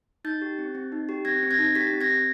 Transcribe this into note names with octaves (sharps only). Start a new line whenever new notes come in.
D#4 G6 A6
G4
C4
C4
D#4
G4
C4 G#6 A#6
C4
G#6 A#6
D#4
G4 A6 B6
C4
G#6 A#6
C4